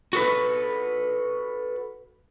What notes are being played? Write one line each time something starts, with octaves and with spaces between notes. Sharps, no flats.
F#4 A4 B4